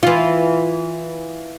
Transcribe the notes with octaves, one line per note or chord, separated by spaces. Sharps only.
E3 F4